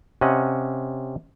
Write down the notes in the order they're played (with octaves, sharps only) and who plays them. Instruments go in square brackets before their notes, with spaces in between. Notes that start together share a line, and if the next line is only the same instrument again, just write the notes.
[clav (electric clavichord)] C3 C#4 D#5 F#5